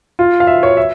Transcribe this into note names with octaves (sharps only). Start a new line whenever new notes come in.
F4
F5
E5
C#5
E5